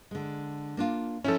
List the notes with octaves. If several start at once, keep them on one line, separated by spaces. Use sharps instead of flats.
D3 G#3
A#3 D4 F4
F3 C#4 D#4 E4 A4